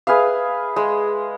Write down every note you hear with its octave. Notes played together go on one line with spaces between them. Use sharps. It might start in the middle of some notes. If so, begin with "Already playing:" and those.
G#4 B4 E5 F5
G#3